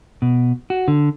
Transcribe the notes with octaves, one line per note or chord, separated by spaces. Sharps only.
B2
F#4
D3